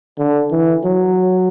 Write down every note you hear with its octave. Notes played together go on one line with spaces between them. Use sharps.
D3
E3
F#3